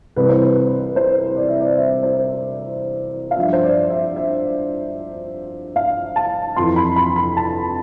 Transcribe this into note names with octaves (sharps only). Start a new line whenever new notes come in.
C2 C3 E3 B4
C5
B4
C5
D5
E5
D5
E5
C5
F5
G2 F3 E5
C5
D5
E5
E5
F5
A5
F2 E3 C6
B5
B5
B5
A5